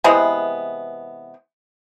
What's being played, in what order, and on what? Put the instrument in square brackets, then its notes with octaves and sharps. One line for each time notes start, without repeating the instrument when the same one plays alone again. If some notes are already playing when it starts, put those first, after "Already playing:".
[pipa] C3 E3 G#3 B3